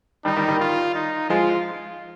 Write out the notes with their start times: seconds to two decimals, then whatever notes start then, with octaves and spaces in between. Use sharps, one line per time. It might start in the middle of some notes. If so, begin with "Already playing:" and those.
0.25 D#3 G3 D#4
0.36 D#3 G3
0.48 D#3 G3
0.60 F4
0.95 D#4
1.30 F3 G#3 F4